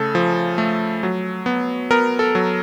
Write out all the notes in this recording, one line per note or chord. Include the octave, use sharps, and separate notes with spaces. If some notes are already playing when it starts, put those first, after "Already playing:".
Already playing: C#3 A3 A4
F3
A3
F#3
B3
B3 A#4
A4
F#3